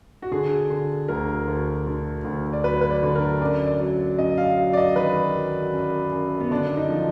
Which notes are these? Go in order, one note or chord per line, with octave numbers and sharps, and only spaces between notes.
F#4
D3 G#4
D3
D2 A#4
D2
D3
D2
D5
F#3 B4
B4
D5
D3
A#4
F#2 D5
D5
F#3
F#2 D#5
F5
F#3
D5
D#5
D#3 B4
F#3
F#2
F#2
B3
D3 D4
D#4
F3